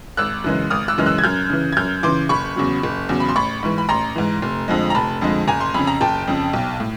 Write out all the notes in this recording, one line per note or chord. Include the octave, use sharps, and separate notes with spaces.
G#1 E6 F#6
F#2 C#3 E3 G#3
G#1 D#6 F6
E6 F#6
F#2 C#3 E3 G#3 F6
E6 F#6
G#6
F#2 F6 G6
C#3 E3
G#6
F#2 F6 G6
C#3 E3 C6 D6
F#1 B5 C#6
E2 C#3 F#3
F#1
E2 C#3 F#3
B5
C6
A1 B5 C#6
G#2 E3
B5
A1 A#5 C6
G#2 E3
F1
F2 D3 F3 G#3
A#5
F1 A5 B5
F2 D3 F3 G#3
F#1 G#5 A#5
C6
F2 C#3 B5
A#5
F#1 G5 A5
F2 C#3
B1
A2